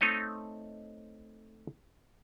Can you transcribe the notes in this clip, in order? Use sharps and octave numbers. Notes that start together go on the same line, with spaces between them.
A3 C4 D#4 C#5 D#5